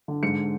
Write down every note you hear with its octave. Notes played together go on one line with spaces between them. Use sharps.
D3
G#2 C#7